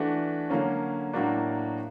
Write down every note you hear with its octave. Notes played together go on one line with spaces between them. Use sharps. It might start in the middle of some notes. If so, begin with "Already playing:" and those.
Already playing: E3 A3 D4 F#4
D3 F#3 A#3 C#4
A2 F#3 A#3 D4 F#4